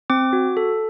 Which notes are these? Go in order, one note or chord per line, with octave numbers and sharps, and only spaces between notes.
C4 D6
F#4
A4